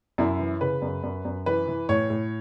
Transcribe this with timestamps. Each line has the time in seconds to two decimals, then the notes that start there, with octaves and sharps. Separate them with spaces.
0.18 F#2 E4
0.39 E3
0.61 C#3 B4
0.82 F#2
1.03 F#2
1.25 F#2
1.46 E3 B4
1.68 E3
1.89 A2 C#5
2.10 A2